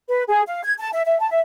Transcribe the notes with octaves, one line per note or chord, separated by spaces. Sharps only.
B4
G#4
F5
G#6
A5
E5
E5
A5
E5